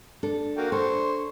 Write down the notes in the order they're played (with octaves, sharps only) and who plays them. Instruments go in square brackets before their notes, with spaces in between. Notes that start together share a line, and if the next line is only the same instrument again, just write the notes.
[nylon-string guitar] D4 A4
[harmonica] A#3 F#4 G5
[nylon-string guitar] D4 A4 [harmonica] C5 C#6